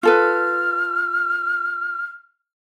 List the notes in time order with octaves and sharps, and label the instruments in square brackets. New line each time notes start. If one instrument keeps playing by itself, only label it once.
[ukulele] F4 A4 B4 [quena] F6